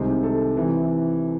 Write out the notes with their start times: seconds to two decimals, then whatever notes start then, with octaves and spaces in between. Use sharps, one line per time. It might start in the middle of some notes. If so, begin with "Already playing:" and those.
Already playing: C2 C3 D#3 G#3 C5
0.23 A4
0.56 C3 E3